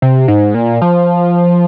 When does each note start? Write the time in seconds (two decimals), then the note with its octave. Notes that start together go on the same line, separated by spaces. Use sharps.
0.02 C3
0.28 G#2
0.54 A#2
0.82 F3